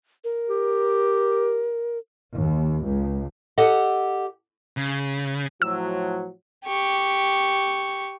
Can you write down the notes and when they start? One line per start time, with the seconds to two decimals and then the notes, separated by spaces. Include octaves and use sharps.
0.24 A#4
0.49 G4
2.35 D#2
2.85 C#2
3.58 G4 A4 D#5 F#5
4.77 C#3
5.62 A2 F3 F#3 E6
6.66 G4 C#6